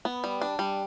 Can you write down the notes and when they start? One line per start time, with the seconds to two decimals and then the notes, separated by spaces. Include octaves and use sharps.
0.05 B3
0.24 G3
0.41 D4
0.59 G3